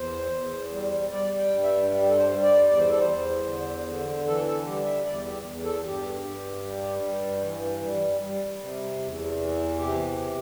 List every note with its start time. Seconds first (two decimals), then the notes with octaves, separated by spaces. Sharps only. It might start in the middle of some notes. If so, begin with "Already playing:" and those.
Already playing: E2 C5
0.32 E2
0.71 G3
1.11 G3 D5
1.37 G5
1.50 G2
1.63 E5
1.90 G3
2.02 G4
2.09 A4
2.16 C5
2.29 G3
2.42 D5
2.68 E2 D5
2.78 C5
2.89 A4
2.99 C5
3.08 E2
3.47 D3
3.87 D3
4.26 E3 A4
4.46 A4
4.65 G3 G4
4.85 E5
5.05 E2 D5
5.25 G4
5.45 E2
5.64 A4
5.84 G2 G4
6.23 G2
6.63 G3
7.02 G2
7.42 E3
7.81 G3
8.21 G3
8.60 C3
8.99 E2
9.38 E3
9.78 C3 G4
10.18 C3